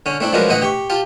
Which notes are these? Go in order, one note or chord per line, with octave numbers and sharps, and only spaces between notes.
D3 C#4
A3 C4 D4 E4
F3 F#3 G#3 D4 A#4 B4
A2 D3 E3 D#5 E5 F#5
G4 C#6
F4 G4 A5